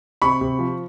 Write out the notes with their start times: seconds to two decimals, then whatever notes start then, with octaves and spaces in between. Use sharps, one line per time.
0.22 C3 B5 C#6
0.41 C3
0.59 F3